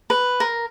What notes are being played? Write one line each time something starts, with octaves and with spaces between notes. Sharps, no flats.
B4
A#4